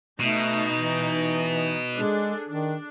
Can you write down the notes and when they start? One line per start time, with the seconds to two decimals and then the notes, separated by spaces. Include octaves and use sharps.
0.21 B2 A3 D#4
0.74 E3
1.96 G#3 D4 G#4 A4
2.49 D#3 D4